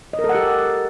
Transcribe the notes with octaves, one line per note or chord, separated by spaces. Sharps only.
D#5
A#4
A4
F#5
G4